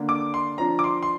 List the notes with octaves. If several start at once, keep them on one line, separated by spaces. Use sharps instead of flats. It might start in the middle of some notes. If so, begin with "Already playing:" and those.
Already playing: D3 A#3 D4
D6
C6
F3 D4 A#5
D6
C6
C6